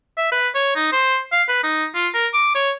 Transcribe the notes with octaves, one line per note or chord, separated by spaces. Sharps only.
E5
B4
C#5
D#4
C5
F5
B4
D#4
F4
A#4
D6
C#5